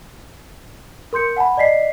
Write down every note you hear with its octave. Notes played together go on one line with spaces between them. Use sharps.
A#4 C6 G6 C#7
F#5 G#5 A5 B5
D5 D#5 B6 C7